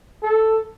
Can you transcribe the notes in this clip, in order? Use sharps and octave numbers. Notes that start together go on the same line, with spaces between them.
A4